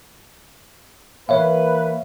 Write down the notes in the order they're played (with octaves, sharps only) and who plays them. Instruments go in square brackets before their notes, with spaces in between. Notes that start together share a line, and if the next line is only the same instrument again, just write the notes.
[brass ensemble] E3 A#3 B4 [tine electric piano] C#5 E5 F5